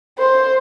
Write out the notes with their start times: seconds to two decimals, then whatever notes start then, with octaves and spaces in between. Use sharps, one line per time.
0.18 C5